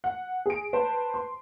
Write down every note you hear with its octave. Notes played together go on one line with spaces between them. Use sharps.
F#5
G#4 D7
B4 C5 A5
C6